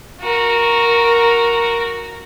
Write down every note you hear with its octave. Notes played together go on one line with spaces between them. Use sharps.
F#4 A#4